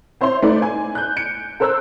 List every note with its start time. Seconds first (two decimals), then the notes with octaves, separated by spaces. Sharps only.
0.21 C4 C5 C#5 E5 C6
0.42 A3 D#4 B4 C5 D5
0.62 G#5
0.95 F#6 G6
1.17 C#7 D7
1.60 A4 A#4 C5 E6 F#6